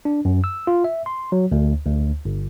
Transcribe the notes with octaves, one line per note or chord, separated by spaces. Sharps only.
D4
F#2
E6
F4
E5
C6
F#3
D2
D2
G1